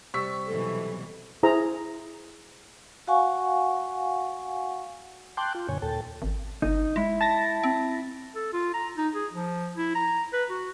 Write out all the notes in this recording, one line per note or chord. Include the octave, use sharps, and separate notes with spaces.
C3 G3 C#6 E6 B6
B2 E3 F#3 A4
E4 G#4 C5 A#5
F#4 F5 F#5 G#5 C#6
G5 A5 C6 D6 F#6 G6
F4
F#2 A#2 D3 C#5 G#5
D#2 A#2 A4 G5 A5
G#1
G1 D#4
G#3 E4
A5 A6 A#6
C4
A4
F4
A#5
D#4
G#4
F3
E4
A#5
B4
F#4